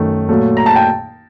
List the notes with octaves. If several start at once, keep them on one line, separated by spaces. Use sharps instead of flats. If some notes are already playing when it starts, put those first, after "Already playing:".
Already playing: F#2 D#3 A3
A#2 F#3 A3
A#5
A5
G5